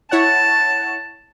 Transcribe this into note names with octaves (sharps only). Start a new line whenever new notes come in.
E4 C#5 F#5 A5